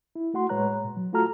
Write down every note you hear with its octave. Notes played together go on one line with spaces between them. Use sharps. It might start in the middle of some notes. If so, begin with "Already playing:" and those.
E4
A3 F#4 F#5 C6
A2 G#3 B4 C#5 A#5 F#6
A#2
F#3
A3 F4 F#4 A4 A#5 F6